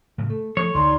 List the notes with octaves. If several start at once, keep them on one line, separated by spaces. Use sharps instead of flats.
A2 C#3 F#3
A3 A4
F3 A3 A4 C#5
D2 D3 E3 D#4 D5 A#5 C6